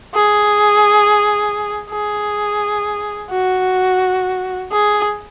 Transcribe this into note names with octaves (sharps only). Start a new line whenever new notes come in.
G#4
G#4
F#4
G#4